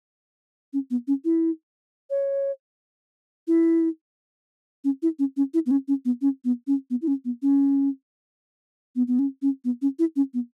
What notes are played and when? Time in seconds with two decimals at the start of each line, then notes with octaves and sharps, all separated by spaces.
0.73 C#4
0.91 B3
1.07 C#4
1.25 E4
2.10 C#5
3.48 E4
4.84 C#4
5.02 E4
5.19 C#4
5.37 C#4
5.54 E4
5.66 B3
5.71 C#4
5.88 C#4
6.05 B3
6.22 C#4
6.45 B3
6.67 C#4
6.90 B3
7.02 E4
7.08 C#4
7.25 B3
7.42 C#4
8.96 B3
9.08 B3
9.19 C#4
9.42 C#4
9.64 B3
9.82 C#4
9.99 E4
10.16 C#4
10.34 B3